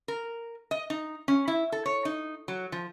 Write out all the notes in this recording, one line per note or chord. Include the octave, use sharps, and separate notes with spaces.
A#4
D#5
D#4
C#4
E4
A4
C#5
D#4
F#3
F3